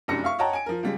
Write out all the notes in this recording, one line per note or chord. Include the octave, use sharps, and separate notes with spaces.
F1 C2 F#2 D4 A#6 C#7
E5 F5 C#6
C#5 D#5 F#5 G5 A5 A#5
G#5 D7
F3 A#4
C#2 G3 G#3